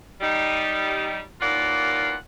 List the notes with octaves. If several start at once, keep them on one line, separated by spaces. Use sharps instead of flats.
G3 D#4
D#2 E3 A#3 F4 D5 F#5